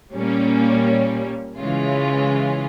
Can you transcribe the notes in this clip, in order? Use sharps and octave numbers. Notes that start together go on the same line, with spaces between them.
A#2 G3 A#3 C#4
C#3 E3 G#3 C#4 F4